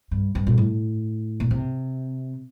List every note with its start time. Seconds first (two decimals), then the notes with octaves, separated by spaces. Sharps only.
0.11 G2
0.35 G2
0.47 A#2
0.58 A2
1.40 A#2
1.51 C3